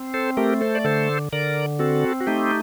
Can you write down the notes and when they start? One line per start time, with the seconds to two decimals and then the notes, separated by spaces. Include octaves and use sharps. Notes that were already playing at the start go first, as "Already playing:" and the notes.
Already playing: C4
0.14 A4 C5
0.37 A3 G4 A#4
0.61 A4 C5
0.75 D5
0.84 D3 A4 C5
1.33 D3 A#4 D5
1.79 C4 F#4 A4
2.21 F#4
2.27 A3 D#4 G4